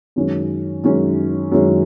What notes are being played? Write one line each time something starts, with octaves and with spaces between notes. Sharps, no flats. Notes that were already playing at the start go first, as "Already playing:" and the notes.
F#2 D#3 G#3 C#4
F#2 D#3 G#3 C#4
F#2 D#3 G#3 C#4